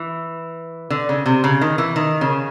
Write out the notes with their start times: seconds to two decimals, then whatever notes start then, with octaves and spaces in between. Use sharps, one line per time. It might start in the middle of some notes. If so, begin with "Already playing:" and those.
Already playing: E3
0.90 D3
1.09 C#3
1.26 C3
1.44 C#3
1.61 D#3
1.78 E3
1.96 D#3
2.21 C#3